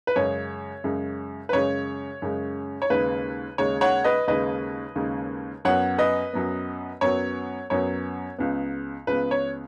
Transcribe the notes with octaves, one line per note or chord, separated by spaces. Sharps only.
B4
F#2 C#3 G#3 C#5
F#2 C#3 G#3
B4
F#2 C#3 G#3 C#5
F#2 C#3 G#3
C#5
D#2 C#3 G#3 B4
D#2 C#3 G#3 C#5
C#5 F#5
B4 D#5
D#2 C#3 G#3 B4 D#5
D#2 C#3 G#3
F#2 F#3 B3 C#5 F#5
B4 D#5
F#2 F#3 B3
F#2 F#3 B3 C#5
F#2 F#3 B3 C#5
C#2 C#3 B3
C#2 C#3 B3 B4
C#5